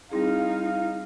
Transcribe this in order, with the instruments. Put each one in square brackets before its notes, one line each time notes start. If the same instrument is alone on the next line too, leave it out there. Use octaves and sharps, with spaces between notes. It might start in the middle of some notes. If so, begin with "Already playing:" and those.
[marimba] G3 C4 G#4 [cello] D#4 [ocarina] E4 [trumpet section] F5